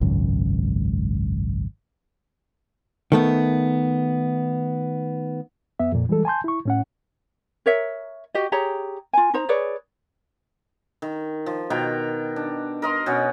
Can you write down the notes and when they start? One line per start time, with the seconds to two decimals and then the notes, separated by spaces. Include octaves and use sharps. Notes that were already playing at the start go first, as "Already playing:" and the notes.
0.01 G#1 C#2 F#2
3.12 D#3 A3 B3
5.79 F2 B3 E5
5.93 F2 A#2
6.09 E3 G3 G#3 A4
6.25 G#5 A5 C6 G6
6.44 E4 C#6
6.65 A2 C#4 F#5
7.66 A#4 C#5 E5
8.34 F#4 G4 D#5
8.52 G4 G#4 C#5 A#5
9.13 F4 G#5
9.34 D#4 C5 A#5
9.49 G#4 B4 C#5 D5
11.02 D#3
11.46 F3
11.70 B2 D#3 G5 A#5
12.36 D4
12.82 A#4 D#5 C6
13.06 B2 C#4 F#5